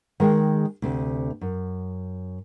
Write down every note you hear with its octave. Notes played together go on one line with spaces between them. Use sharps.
D#3 G#3 G#4 G5
D2 C3
F#2